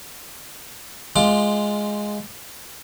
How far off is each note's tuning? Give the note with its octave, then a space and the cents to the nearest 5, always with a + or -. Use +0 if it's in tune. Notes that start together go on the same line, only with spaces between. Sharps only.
G#3 +0 F4 +0 D6 +30